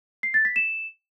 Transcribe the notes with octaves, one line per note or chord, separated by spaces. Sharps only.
C7
A6
B6
E7